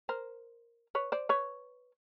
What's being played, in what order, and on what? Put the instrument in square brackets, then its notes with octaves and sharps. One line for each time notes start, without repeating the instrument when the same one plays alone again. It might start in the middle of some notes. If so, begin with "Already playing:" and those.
[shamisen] A#4 C5
B4 C#5
C5 D5
B4 C#5